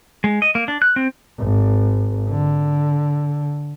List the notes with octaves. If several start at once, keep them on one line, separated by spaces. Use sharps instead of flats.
G#3
D#5
A#3
D4
F#6
C4
G#1
D3